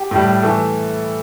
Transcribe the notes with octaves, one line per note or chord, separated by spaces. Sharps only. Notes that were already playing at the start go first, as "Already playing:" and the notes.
Already playing: G4
A2 G3
E3 A3 A4